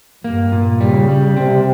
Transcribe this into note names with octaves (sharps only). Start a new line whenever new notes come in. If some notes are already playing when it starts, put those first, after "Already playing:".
G2 A#3
A#2
C#3 G3
G3
C3 C4